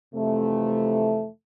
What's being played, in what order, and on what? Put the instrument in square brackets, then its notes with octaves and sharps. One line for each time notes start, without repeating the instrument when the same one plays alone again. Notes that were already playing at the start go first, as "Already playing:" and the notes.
[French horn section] F2 C3 E3 A3